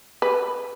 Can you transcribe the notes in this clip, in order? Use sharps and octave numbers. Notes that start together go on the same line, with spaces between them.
B4